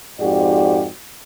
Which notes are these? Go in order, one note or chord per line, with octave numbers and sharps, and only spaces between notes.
F2 G#2 F#4 G4 D5